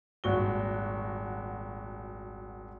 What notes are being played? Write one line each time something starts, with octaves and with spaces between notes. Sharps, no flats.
D#1 G#1 F#4 G7